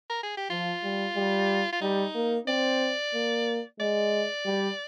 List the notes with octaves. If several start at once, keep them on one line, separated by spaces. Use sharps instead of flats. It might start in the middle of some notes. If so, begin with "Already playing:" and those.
A#4
G#4
G4
F3 F4
G3
G3
F4
G3 D#4
A#3
C4 D5
A#3
G#3 D5
G3